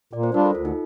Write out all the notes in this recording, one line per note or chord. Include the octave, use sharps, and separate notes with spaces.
A#2 D5
C5
G3 D4 F4 A#4
A4
D2 F4
D#4